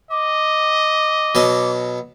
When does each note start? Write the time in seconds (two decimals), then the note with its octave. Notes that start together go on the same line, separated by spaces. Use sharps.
0.11 D#5 D6
1.35 B2 F#3 A5